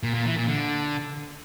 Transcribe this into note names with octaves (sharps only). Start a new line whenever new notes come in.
A#2
A#2
E3
A#2
D3